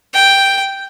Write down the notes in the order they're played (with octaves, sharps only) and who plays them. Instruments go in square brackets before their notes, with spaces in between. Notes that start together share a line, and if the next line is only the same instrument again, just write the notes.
[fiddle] G5